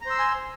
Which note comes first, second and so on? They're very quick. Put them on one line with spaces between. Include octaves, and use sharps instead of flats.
A#5 C5 E6 C6 G#5